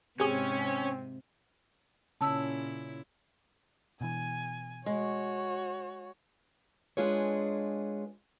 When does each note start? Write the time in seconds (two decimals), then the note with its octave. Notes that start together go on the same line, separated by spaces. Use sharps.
0.20 G#2 C3 C4 C#4 G4 G#4
2.21 A#2 C#3 C#4 E4 A5 E6
4.01 B2 E3 G#5
4.86 G#3 F#4 C#5
6.97 G#3 D4 F4 G#4 B4 C#5